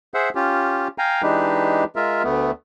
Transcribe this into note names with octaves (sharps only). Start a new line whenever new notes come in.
G#4 C5 E5 F#5
C#4 F4 G4
F5 G5 G#5 A#5
E3 G#3 D4 D#4 G4 B4
G#3 F4 A#4 E5
D2 A3 B3